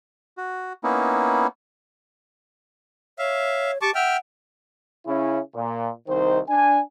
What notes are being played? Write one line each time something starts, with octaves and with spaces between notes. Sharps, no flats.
F#4
A#3 B3 C#4 D#4 E4
C#5 E5 F5
G4 A5 C#6 D6
E5 F#5 G5 F6
C#3 C#4 E4
A#2
C2 D#3 D#4 C5
D4 G#5